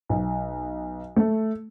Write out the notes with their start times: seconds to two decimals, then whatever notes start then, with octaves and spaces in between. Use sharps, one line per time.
0.09 B1
1.16 A3